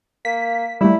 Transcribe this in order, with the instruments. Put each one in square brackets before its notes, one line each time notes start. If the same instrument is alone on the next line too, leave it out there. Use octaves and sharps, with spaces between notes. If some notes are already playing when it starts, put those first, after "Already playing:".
[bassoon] A#3 [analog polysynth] B6
[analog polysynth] G3 A3 [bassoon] E4